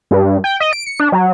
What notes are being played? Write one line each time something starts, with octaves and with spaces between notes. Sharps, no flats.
G2
G5
D#5
D7
C#7
D4
F#3